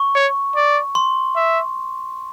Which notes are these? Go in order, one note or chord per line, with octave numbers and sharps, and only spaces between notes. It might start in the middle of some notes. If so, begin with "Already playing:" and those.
Already playing: C#6
C#5
D5
C6
E5